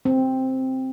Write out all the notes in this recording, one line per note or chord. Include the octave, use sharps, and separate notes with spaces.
C4